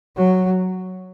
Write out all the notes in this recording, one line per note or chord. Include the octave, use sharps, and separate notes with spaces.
F#3